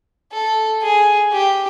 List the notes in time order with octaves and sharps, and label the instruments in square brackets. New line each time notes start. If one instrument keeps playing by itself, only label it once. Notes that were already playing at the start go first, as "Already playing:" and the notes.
[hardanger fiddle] A4
G#4
G4